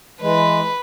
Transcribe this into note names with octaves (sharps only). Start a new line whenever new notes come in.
E3 G#3 B4